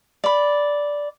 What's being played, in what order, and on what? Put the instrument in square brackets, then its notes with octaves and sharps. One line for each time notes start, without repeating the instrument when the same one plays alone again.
[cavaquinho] D5 B5